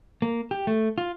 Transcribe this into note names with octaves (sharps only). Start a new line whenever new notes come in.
A#3
G4
A3
F4